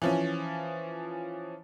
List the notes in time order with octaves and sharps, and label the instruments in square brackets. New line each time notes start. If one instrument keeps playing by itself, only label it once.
[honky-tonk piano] E3 F3 C#4